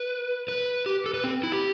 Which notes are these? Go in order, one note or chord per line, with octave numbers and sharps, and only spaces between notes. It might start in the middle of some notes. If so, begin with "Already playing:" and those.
Already playing: B4
B4
G4
A4
B4
C4
E4
G4